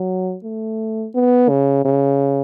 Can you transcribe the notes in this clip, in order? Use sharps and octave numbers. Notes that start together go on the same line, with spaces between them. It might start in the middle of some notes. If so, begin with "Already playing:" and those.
Already playing: F#3
A3
B3
C#3
C#3